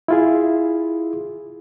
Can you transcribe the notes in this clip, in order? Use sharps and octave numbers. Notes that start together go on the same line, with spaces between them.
E4 F4 G#4